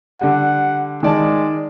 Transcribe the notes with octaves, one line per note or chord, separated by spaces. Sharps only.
D3 G3 F#5
D#3 G#3 D5 A5